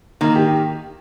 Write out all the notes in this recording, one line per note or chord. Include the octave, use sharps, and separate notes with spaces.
D#3 A#3
G4